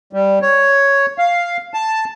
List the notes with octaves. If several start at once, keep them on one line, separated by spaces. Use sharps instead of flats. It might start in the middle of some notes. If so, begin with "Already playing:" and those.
G3
C#5
F5
A5